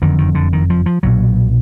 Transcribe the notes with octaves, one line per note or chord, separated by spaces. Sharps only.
F#1 F2 D3 D#3
D#3
D3
D#3
F3
F3
B1 A#2 F#3